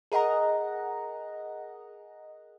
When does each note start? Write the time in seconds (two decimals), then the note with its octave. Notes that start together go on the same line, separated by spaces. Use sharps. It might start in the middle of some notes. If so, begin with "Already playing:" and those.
0.12 G#4 A#4 D#5 F#5 A#5